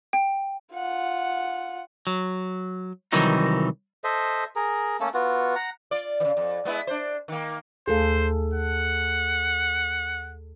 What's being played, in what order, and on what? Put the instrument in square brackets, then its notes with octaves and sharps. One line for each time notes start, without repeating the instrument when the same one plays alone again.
[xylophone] G5
[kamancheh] F4 F#5
[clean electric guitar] F#3
C2 D#3 E3 F#3 D#4
[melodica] A4 C5 D#5 E5
G#4 A#4
A3 A#3 C#4 A4
B3 F4 F#4
F#5 A#5
[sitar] F4 D5
C#3 E3
F2
G#3 B3 E4
D4 C5
D#3 A#3
[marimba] D#2 A3 F5 [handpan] G#4 A4 [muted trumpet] C5
[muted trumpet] F#5